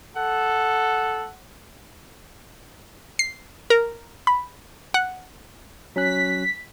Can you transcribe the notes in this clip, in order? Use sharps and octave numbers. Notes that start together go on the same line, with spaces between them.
A4 F#5
C7
A#4
B5
F#5
F#3 C#4 F#6 B6